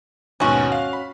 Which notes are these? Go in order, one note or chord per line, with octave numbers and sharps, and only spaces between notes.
D#2 G#2 B2 C#4 F#4
F5
B5